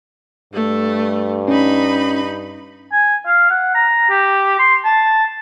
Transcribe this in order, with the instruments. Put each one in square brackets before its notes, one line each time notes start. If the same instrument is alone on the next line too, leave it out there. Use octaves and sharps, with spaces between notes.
[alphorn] G2 [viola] A3
[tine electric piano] C#4 [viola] D#4 B5
[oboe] G#5
F5
F#5
A#5
G4
C6
A5